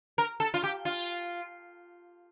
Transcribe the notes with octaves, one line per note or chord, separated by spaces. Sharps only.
A#4
A4
F4
G4
F4